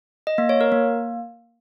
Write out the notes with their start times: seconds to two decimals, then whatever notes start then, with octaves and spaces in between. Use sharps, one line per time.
0.27 D#5
0.38 A#3
0.49 C#5
0.61 A#4
0.72 A#3